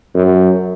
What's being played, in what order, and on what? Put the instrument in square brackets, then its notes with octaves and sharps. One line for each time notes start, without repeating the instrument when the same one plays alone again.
[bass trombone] F#2